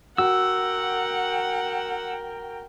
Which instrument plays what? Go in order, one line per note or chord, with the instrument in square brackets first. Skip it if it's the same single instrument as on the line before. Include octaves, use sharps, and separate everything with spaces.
[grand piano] F#4 [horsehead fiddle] A#4 G5 [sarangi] F#5 [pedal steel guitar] E6